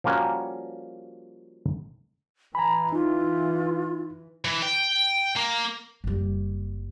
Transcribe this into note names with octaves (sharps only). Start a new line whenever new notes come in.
F3 G3 A#3 C#4 F#4
E3 G#5 A#5 B5
D#4 F4
E3
G5
A#3
F#1 G3